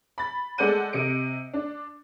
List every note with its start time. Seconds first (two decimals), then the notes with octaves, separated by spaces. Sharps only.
0.18 B5 A6
0.58 G#3 A4 D5 F#5 G6 D#7
0.93 C3 D#5 C#7 D7
1.54 D4